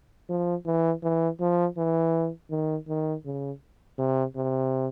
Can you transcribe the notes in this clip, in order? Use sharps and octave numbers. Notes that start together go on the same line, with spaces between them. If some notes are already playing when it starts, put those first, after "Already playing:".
F3
E3
E3
F3
E3
D#3
D#3
C#3
C3
C3